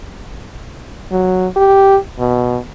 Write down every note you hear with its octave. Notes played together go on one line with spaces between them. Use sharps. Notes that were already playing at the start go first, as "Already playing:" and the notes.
F#3
G4
B2